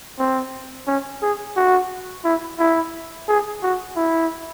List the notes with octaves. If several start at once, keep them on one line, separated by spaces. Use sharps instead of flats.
C4
C#4
G#4
F#4
E4
E4
G#4
F#4
E4